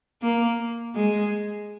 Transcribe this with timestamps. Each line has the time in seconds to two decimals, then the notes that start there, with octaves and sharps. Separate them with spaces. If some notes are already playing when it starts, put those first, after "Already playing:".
0.22 A#3
0.96 G#3